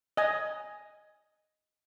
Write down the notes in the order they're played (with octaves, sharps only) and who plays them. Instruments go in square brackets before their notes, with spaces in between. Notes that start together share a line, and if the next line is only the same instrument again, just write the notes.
[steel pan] D#5 G#5